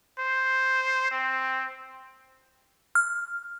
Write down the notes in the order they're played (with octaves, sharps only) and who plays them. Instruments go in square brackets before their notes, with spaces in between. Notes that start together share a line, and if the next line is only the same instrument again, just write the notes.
[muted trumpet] C5
C4
[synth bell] F6